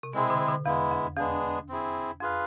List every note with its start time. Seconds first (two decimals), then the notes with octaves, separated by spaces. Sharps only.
0.03 C3
0.13 B2 G#3 C4 E4 G#4
0.30 D3
0.49 D3
0.65 E2 G#3 B3 E4
0.91 F2
1.17 E2 G#3 B3 D4 G#4
1.69 C4 E4 G#4
2.21 F2 F4 G#4 B4 F5